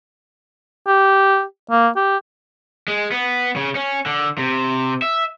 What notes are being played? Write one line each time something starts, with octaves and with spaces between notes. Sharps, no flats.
G4
A#3
G4
G#3
B3
C#3
C#4
D3
C3
E5